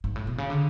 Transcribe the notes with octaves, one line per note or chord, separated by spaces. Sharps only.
G#2
A2
B2
C#3
D3